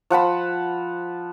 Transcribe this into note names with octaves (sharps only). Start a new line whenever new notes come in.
F3 F#5 A5 B5